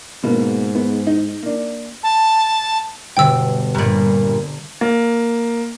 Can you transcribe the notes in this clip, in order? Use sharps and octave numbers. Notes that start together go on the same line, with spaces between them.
G#2 B2 A#3
B3
D#4
A#3 D4
A5
G1 B2 D3 G5 E6
G2 A#2 A#5 B5
A#3